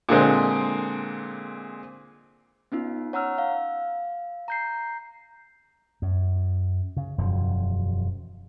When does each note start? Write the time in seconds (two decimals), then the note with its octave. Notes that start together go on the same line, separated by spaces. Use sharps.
0.09 A#2 D3 G#3 C4
2.72 B3 C#4 D#4 F4
3.13 C#5 F#5 A#5 E6 F6
3.38 F5
4.48 A#5 G6 C7
6.02 F#2
6.97 C#3
7.18 E1 F#2 F3